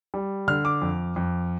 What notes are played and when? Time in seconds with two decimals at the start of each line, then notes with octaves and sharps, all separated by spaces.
0.14 G3
0.48 D3 F6
0.65 D6
0.82 F2
1.16 F2